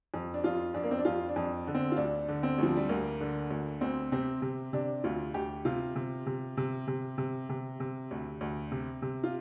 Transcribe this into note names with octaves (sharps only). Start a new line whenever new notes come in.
F2
D4
F2 F4
F2 D4
A#3
C4
D4
F2 F4
D4
F2
D3
C4
F4
D2 D4
D3
C4
D2 F3
G3
D2 A#3
D3
D2
D2 C4
C3 C4
C3
C3 D4
D2 F4
D2 G4
C3 F4
C3
C3
C3
C3
C3
C3
C3
D2
D2
C3
C3
F4